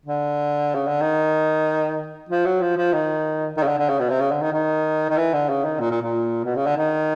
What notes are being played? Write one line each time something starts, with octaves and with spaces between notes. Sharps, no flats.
D3
C#3
D3
D#3
F3
F#3
F3
F3
D#3
D#3
C#3
D3
D3
C#3
B2
C3
C#3
D3
D#3
D#3
D#3
E3
D3
C#3
D#3
A#2
A#2
A#2
B2
C#3
D3
D#3